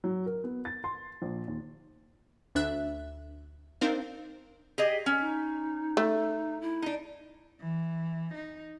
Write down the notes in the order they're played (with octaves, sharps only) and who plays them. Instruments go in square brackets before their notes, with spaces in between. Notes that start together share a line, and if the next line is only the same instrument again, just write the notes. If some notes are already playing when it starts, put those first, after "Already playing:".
[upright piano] F#3
A#4
B3
A6
C6
A#1
D#2
[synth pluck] D2 D4 E5 F#6
C4 D4 D#4 A#4 C5 F5
[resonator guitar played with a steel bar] G4 G#4 D#5
C#4
[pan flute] D#4
[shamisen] A3
[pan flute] E4
[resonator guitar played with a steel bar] D4 D#4
[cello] E3
D#4